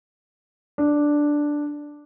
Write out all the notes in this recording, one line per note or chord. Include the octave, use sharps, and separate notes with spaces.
D4